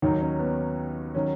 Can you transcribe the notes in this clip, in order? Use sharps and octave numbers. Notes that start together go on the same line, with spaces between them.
D#2 D#3 F#3 D#4
C#4
B3
D#3 F#3 C#4